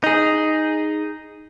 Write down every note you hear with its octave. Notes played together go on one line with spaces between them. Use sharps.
D#4 G#4